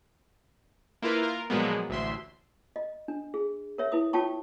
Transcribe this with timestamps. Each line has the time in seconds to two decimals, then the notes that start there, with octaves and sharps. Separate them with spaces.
1.02 A#3 E4 F4 A#4 B4
1.22 F4 A#4
1.50 A#2 F3 F#3 G#3 A#3 B3
1.89 A1 D2 E5 C6
2.76 D#5
3.08 D4
3.34 G#4
3.78 A#4 C#5 E5
3.92 E4 B4 D#6
4.13 F4 C#5 G5 A5 C#6